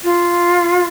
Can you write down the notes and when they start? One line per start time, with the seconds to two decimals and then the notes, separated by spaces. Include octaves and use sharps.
0.03 F4